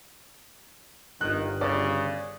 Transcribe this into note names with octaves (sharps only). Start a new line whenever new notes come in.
G1 D#3 F#6
C#3 D5